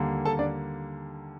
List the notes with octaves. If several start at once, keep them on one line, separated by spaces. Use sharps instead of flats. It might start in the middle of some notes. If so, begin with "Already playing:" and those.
Already playing: D#2 D3 G3 A#3
A4 A5
D4 D5